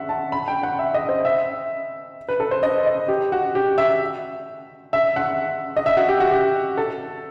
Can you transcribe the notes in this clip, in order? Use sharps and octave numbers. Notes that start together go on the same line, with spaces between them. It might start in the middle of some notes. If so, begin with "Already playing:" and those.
Already playing: E5 F#5
A5
B5
G5
F#5
E5
D#5
C5
E5
B4
A4
C5
D#5
D#5
G4
F#4
G4
E5
E5
F#5
D#5
E5
F#4
G4
F#4
G4
A4